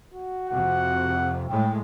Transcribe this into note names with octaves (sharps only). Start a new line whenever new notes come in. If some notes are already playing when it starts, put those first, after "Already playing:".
F#4
F2 C3 F#5
A2 G#3 G5